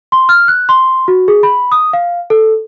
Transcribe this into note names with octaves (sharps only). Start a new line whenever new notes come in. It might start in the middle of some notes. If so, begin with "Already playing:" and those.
C6
F6
F#6
C6
F#4
G#4
B5
D#6
F5
A4